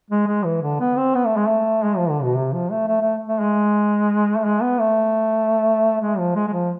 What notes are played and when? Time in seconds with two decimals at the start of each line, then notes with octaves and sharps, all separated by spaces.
0.11 G#3
0.27 G#3
0.45 E3
0.62 D3
0.80 B3
0.97 C4
1.15 B3
1.26 A3
1.37 G#3
1.47 A3
1.84 G#3
1.97 F3
2.10 D3
2.23 B2
2.36 C3
2.54 F3
2.71 A3
2.88 A3
3.01 A3
3.27 A3
3.40 G#3
4.37 A3
4.45 G#3
4.62 B3
4.80 A3
6.01 G#3
6.18 F3
6.36 G#3
6.48 G#3
6.53 F3